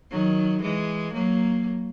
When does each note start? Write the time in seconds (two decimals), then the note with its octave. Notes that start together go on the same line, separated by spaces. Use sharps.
0.11 D#3 F#3
0.62 E3 G#3
1.13 F#3 A#3